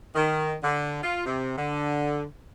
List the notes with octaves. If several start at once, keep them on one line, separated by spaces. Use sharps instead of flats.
D#3
D3
F4
C3
D3